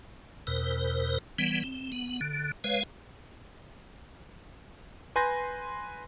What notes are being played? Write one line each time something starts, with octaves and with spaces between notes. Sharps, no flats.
E2 B2 A#4 C5
E3 G3 B3
C4
B3
D3
G#3 B4 C#5 F5
B4 G#5 C6 G6 A#6